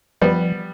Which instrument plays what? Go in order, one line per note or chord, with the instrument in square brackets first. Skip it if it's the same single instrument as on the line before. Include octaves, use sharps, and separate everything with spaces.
[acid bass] F3 [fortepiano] G3 B3